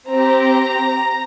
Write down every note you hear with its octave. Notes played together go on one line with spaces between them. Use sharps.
C4 G4 A#5